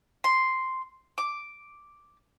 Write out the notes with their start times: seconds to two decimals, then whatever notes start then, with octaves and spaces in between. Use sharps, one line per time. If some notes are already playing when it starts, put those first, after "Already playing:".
0.24 C6
1.18 D6